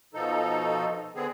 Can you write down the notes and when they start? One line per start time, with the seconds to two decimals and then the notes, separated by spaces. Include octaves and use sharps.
0.14 B2 F3 D#4 A4
1.15 D3 B3 C4 G#4